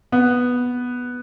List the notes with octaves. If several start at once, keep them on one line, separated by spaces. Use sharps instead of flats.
B3